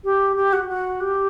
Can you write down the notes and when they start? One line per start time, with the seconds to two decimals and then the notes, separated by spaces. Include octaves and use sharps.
0.04 G4
0.36 G4
0.53 F#4
0.68 F#4
1.00 G4